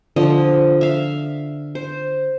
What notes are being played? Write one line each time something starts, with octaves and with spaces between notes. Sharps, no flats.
D3 F3 D#5
E5 F5
C5